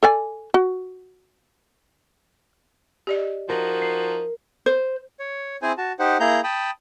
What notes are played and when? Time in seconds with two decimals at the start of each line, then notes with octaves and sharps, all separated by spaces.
0.03 A4 D5 G#5
0.54 F#4
3.07 G4 D5 D#5
3.49 F3 D#4 F#4 A#4
3.82 C7
4.66 C5
5.19 C#5
5.62 C4 E4 G#4 C5 G#5
5.78 F#4 A5
5.99 D#4 G4 C5 F#5
6.20 A#3 E4 G#4 A#5 G6
6.44 G5 A5 B5 D#6